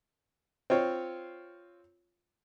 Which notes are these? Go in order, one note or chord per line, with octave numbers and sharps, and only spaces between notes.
C4 F4 C#5